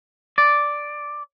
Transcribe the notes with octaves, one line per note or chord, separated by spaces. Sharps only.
D5